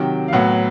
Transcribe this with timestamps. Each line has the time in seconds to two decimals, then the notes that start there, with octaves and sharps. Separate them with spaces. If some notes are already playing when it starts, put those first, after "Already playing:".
Already playing: C3 D#3 F#3 G5
0.28 F5
0.33 A2 F#3 B3 F#5